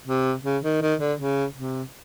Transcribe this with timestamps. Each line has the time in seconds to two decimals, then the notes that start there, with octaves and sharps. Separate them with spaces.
0.08 C3
0.44 C#3
0.64 D#3
0.82 D#3
1.00 D3
1.19 C#3
1.56 C3